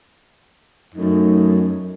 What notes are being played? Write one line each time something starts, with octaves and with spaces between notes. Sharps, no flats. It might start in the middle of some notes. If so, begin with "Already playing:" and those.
F#2 A3 D#4